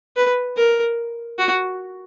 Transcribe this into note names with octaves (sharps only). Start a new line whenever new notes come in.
B4
A#4
F#4